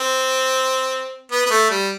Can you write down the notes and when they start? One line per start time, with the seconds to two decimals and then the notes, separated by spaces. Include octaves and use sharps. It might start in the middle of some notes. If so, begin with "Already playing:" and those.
Already playing: C4
1.32 B3
1.46 B3
1.50 A3
1.70 G3